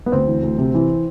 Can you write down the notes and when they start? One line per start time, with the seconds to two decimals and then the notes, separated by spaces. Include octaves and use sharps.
0.06 B3
0.12 D2 C4
0.27 E3
0.43 D2
0.58 C3
0.74 E3